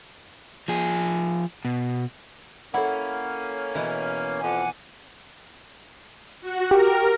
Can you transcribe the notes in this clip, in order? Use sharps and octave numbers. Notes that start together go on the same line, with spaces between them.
F3 G#4
B2
A#3 C#4 E4 A4 F#5
B2 E3
F2 F#5 G#5 D6
F#4
G4 A#4